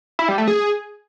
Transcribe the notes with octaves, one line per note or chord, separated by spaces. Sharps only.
E4
G3
A3
G#4